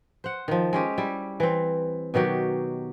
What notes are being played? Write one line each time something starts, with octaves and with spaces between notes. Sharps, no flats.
C5 F#5
D#3 F3
G#3 C#4 G4
G3 E4
E3 C4
B2 D#3 F#3 G4